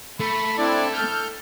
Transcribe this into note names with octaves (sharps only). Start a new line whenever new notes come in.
A3 B5
C4 D4 E4 D5
A4 F6 G6